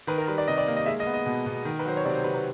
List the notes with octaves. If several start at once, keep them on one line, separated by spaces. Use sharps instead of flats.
D#3 B4
A#4
G3 B4
D5
C3 D#5
D5
A#3
D#5
G#3 E5
D#5
B3
D#5
B2
B2
D#3
B4
F#3 C5
C#5
C3 D5
C5
C3 B4
B4